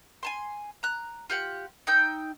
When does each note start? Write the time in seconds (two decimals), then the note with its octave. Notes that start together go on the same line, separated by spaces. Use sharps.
0.23 G#5 A5 C6
0.83 A#5 F#6
1.30 F4 G4 F#5
1.87 D#4 G5 E6 G6